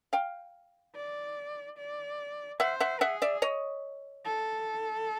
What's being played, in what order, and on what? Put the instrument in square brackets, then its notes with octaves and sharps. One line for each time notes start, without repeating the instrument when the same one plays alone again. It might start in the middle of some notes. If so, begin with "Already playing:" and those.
[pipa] F5 G5
[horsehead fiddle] D5
D5
[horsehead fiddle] C5 [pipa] E5 F#5
[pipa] E5 F#5
[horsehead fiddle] G#4 [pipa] E5 F#5
[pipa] D5 E5
C#5 D#5
[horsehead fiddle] A4